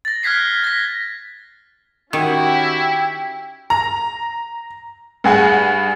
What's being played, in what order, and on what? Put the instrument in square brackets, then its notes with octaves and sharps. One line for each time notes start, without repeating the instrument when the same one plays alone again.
[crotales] A6 A#6
F6 F#6 G#6 B6 C7
A#6 B6
[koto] D#3 [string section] C#4 F#4 G4 [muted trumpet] E4 [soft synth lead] G5
[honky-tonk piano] A#5
G2 G#4 F#5 G#5